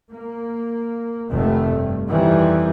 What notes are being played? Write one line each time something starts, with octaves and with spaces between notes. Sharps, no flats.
A#3
F1 D#3 A3
G2
F2 D#3 E3 G3